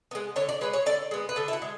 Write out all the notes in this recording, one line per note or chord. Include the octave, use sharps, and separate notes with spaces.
G#3 B3
D3 C#5
D5
G#3 B3 B4
C#5
D3 D5
G#3 B3
B4
D3 A4
E4
F#4
G#3